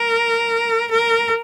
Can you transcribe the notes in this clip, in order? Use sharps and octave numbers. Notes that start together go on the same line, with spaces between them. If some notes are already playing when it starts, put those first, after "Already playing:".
Already playing: A#4
A#4